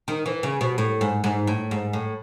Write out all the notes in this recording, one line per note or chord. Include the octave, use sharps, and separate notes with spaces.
D#3
E3
C#3
B2
A2
G#2
G#2
A2
G#2
A2